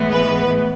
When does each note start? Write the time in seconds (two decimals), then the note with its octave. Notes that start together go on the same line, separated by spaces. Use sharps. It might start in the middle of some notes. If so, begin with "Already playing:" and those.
Already playing: A2 E3 G#3 B3
0.13 B4